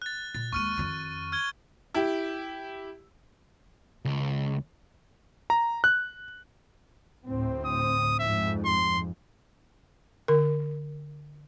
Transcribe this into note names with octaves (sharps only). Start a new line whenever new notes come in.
F#6 A6
A#2 A6
D#2 G#3 C#6 F6 D#7
F2 D#3
F6 G#6 G7
E4 G4
C#2
A#5
F#6
D2 A2 C4
D#6
F2 G#2 E5
C6
D3 A#4